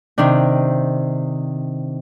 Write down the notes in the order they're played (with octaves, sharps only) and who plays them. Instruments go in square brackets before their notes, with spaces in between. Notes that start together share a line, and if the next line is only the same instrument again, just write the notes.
[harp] C3 D#3 D4